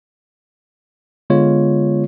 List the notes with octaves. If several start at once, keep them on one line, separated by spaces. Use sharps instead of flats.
D3 G#3 B3 F4 C#5